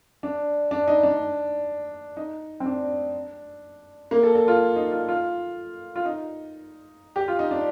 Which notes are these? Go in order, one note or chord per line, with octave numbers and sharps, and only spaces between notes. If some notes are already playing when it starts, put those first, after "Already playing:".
D4
D4
D#4
D4
D#4
C4
D4
A#3
A4
A4
F4
D#4
F4
F4
F4
D#4
G4
F4
D#4
D4